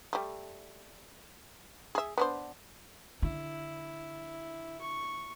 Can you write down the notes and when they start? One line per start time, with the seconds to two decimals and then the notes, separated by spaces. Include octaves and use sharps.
0.13 G3 A3
1.95 G#4 E5
2.18 B3 D4 C5
3.22 D3 E4
4.81 C#6